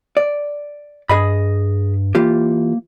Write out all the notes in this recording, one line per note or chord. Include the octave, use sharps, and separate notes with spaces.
D5
G2 G#4 D#5 B5
E3 A#3 F4 G4